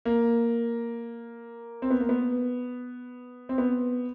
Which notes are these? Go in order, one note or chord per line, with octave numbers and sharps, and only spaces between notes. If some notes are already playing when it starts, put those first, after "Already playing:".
A#3
C4
B3
A#3
B3
C4
B3